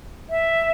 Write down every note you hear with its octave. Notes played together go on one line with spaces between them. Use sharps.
E5